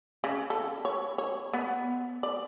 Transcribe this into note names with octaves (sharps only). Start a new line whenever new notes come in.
C#3
A4
C#5
C#5
B3
D5